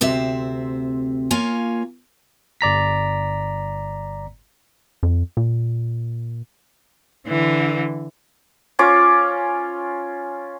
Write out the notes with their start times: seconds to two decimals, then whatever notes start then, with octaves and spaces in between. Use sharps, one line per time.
0.01 D2 C3 C4 E5
1.31 A#3 F4 C#5 G#5
2.61 G1 D5 A#5 B6
5.03 F2
5.37 A#2
7.27 D3 E3
8.79 C#4 F4 D6